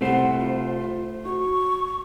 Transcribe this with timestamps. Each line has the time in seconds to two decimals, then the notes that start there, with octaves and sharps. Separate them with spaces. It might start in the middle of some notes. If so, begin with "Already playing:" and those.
0.01 C2 A3 C5 F#5
0.39 F4
1.25 F#4 C#6